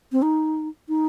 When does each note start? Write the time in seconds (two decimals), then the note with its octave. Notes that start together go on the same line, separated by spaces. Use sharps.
0.12 C4
0.22 D#4
0.89 D#4